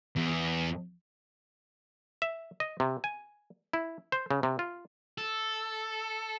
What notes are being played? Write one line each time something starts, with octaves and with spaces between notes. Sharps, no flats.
E2
E5
D#5
C3
G#5
E4
C5
C#3
C3
F4
A4